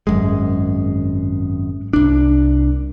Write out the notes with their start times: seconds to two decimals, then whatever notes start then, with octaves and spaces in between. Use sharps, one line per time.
0.07 G#1 F#2 G#3
1.93 C2 D4